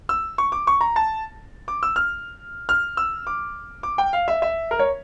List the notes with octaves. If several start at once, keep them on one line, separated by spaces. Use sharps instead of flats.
E6
C#6
D6
C#6
A#5
A5
D6
E6
F6
F6
E6
D6
D6
G5
F5
E5
E5
A#4
C#5